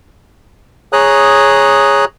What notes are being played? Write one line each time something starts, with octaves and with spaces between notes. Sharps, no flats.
G#4 C#5 A#5 D#6 F#6